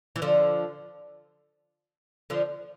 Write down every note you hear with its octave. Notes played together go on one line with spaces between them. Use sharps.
E3
D3 F3
D3 F3